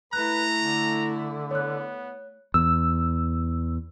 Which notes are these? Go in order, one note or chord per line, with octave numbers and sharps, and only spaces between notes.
A3 E4 B4 A#5 F#6
D3
B3 C#5 F#6
E2 E6